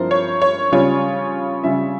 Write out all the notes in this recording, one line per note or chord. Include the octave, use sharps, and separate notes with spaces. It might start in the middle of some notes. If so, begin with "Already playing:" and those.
Already playing: G2 F3 C4 E4 A#4 C5
C#5
C#5
C#3 G3 C#4 F4 C#5
C#3 G3 C#4 F4 E5